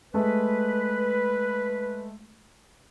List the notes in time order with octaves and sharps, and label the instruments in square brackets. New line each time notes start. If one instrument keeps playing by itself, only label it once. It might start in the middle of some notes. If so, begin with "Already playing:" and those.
[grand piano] G#3 A3 [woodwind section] B4